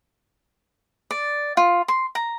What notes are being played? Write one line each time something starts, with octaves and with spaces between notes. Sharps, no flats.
D5
F4
C6
A#5